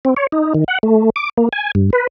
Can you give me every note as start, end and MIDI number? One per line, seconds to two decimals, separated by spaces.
0.05 0.14 60
0.17 0.27 73
0.32 0.53 63
0.54 0.64 51
0.68 0.78 78
0.83 1.10 57
1.16 1.29 86
1.37 1.49 58
1.53 1.71 80
1.75 1.90 43
1.93 2.07 71